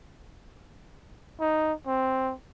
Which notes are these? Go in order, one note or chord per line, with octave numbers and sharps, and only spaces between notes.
D#4
C4